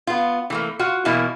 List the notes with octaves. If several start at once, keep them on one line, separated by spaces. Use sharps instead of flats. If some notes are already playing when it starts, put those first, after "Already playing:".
B3 F4
E3 A3 A#3
F4 F#4
B2 E3 A#3 E4